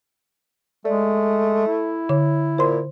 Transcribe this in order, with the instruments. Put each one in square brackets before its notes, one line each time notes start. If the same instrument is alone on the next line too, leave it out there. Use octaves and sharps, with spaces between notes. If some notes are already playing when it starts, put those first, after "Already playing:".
[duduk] G#3 [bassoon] A3 [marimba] D5
[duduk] E4
[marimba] D3 C#5
[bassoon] A#2 [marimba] C5 C6